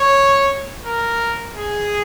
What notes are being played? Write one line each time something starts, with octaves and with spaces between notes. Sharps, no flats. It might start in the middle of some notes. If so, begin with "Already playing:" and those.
Already playing: C#5
A#4
G#4